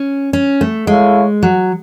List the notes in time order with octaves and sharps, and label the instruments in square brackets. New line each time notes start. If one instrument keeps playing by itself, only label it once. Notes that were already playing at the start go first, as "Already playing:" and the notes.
Already playing: [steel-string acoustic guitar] C#4
C#4
A3
[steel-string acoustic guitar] G#3 [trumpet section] E4 A4 C#5 F5
[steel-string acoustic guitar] F#3